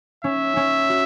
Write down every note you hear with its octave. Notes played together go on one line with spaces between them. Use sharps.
C#4 E5
C#4
F#4